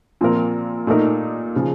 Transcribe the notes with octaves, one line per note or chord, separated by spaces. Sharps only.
A#2 F3 C4 F4 A#4
A#2 A3 D#4 A#4
C#3 F3